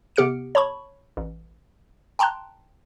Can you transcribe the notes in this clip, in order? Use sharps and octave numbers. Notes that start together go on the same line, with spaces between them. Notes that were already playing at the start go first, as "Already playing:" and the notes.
C3 B3 G4 F6 C#7 D7
C#5 A5 B5 C#6
A1
G5 A5 A#5 C6 F#6